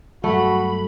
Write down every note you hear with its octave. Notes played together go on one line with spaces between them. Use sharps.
G2 F#3 A3 F#4 B5